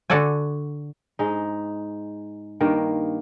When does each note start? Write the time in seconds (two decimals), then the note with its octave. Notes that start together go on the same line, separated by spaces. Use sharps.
0.10 D3 D4 F#4 A4 D5 G#5
1.19 G#2 G#3 D#4
2.60 G2 D#3 A#3